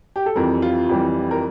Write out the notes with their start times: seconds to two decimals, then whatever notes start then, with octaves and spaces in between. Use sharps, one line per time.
0.16 G4
0.26 A4
0.35 F2 E3 G3 A#4
0.62 F4
0.89 F2 E3 G3 G4
1.31 A#4